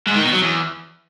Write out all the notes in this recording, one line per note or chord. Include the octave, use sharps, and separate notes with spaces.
G#2
D#3
B2
F#3
E2